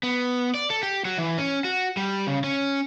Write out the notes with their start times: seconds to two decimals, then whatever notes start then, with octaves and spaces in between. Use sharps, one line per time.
0.03 B3
0.55 D5
0.70 A4
0.83 G4
1.05 F#3
1.18 E3
1.38 C#4
1.65 F#4
1.97 G3
2.27 C#3
2.44 C#4